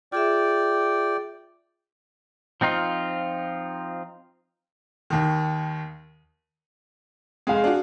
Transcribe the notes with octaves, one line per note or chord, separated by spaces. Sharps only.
F4 G#4 D5 E5 G5
F3 C4 D#4 F4
D#2 D#3
F1 G#3 G#4 F5
D4 F#4